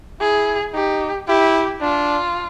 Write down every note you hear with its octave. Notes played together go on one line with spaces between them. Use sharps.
E4 G#4
D#4 G4
E4 G4
D4 F4